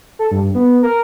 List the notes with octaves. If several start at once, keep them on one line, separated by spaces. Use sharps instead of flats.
A4
G2
B3
A#4